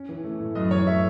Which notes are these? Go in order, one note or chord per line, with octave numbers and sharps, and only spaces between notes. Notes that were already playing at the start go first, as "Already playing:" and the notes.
Already playing: C#4
E3
A3
A2
F#2 D#5
E3 C#5
A3 E5